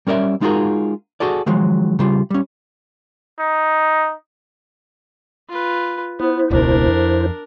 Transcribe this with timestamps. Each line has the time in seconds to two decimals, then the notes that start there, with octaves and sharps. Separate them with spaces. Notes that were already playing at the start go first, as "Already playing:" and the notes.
0.07 G3 C#4 A#4 D5 E5
0.41 G#3 D#4 F4 F#4 G#4 A#4
1.20 F#4 G#4 A4 D5
1.46 D#3 F3 F#3 G#3
1.99 C#3 G3 F4
2.30 G3 C#4
3.40 D#4
5.49 F4 B4
6.20 B3 E4 C5
6.51 E1 C#2 B2 D4 A#4
6.87 F2